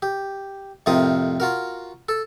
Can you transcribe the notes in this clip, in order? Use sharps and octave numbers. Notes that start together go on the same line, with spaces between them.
G4
F2 A2 C3 F4 A#4 D#6
F4 F#4 A#4
A4